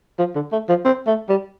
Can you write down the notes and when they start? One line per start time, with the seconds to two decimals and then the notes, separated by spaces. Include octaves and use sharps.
0.19 F3
0.35 D3
0.53 A3
0.69 F3
0.85 C4
1.07 A3
1.29 G3